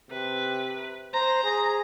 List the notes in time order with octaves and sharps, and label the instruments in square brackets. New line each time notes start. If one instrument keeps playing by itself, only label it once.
[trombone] C3 [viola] B4
[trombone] C5 [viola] A#5
[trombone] G#4